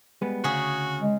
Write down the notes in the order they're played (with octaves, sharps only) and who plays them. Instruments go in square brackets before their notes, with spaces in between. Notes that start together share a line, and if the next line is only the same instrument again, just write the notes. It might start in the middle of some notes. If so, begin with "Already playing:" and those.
[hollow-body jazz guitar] G3 G#3 B3
[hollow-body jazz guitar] D2 [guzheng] C#3 G#4 [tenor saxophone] F#4
[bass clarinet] G#3